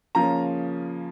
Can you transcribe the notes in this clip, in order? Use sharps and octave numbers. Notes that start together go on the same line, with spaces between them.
C#3 F3 A#3 C#4 A#5